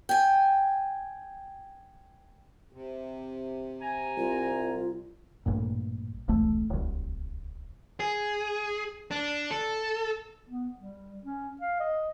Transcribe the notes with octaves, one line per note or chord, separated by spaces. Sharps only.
G5 G#5
C3
G#5 A#5
C2 F4
A1 G2 A#2
E1 C2 A3
D1 C2
G#4
D4
A4
B3
G3
C#4
F5
D#5